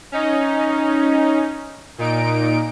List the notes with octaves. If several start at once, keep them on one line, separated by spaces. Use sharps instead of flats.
C#4 D#4
A#2 D#4 D7